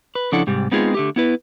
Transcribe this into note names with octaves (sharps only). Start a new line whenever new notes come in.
B4
C#3 F3 D4 E4 A4 F#5
G#2 C3 G3
G#3 B3 C4 D#4 F4 G#4
D3 A3 G4
B3 E4 B4